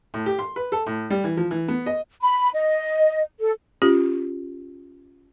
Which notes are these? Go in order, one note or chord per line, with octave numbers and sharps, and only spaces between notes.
A2
G4
C6
B4
A4
A2
G3
E3
F3
E3
B3
D#5
B5
D#5
A4
C#4 F4 G4